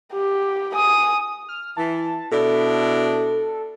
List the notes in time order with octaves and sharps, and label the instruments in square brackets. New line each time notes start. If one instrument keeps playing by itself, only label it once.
[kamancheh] G4
G#5 D#6
[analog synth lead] F6
[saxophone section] E3 [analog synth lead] A5
[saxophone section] B2 D4 E4 [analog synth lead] A4